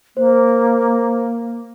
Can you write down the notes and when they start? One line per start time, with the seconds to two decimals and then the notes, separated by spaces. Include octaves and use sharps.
0.17 A#3 C5